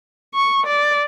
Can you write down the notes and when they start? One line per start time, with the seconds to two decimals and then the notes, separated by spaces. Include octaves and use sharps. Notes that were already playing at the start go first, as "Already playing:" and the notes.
0.35 C#6
0.66 D5